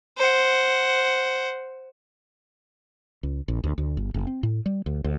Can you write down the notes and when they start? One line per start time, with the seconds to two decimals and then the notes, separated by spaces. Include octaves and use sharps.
0.18 C5 F#5
3.23 C#2
3.48 A#1
3.64 D2
3.78 D2
3.97 G1
4.14 F#1
4.27 C4
4.43 A2
4.66 G3
4.86 D2
5.04 D2